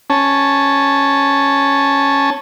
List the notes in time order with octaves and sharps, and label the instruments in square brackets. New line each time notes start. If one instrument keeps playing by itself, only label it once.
[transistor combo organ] C#4 A5